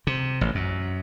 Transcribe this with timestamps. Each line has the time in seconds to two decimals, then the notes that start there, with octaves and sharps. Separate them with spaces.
0.07 C3
0.41 A1
0.55 F#2